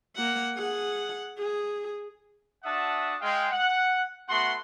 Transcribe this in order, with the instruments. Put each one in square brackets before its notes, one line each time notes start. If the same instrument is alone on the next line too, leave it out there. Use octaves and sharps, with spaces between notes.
[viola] A#3 F#5
G#4 F#5
G#4
[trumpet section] D4 F#4 E5 F#5 A5 D#6
G#3 F5 G5
F#5
A3 B3 F#4 F#5 C6